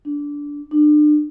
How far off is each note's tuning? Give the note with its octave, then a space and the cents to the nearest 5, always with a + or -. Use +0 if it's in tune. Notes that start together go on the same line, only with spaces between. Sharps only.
D4 -15
D4 +35